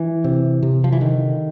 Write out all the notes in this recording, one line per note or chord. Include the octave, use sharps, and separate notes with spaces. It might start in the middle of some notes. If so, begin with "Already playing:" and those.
Already playing: E3
C3
C3
F3
E3
D3 D#3